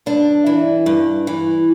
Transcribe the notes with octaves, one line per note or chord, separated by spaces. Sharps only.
G2 D4
E3
G2
E3